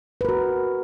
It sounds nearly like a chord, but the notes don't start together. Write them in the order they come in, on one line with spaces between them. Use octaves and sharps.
B4 A#4 F#4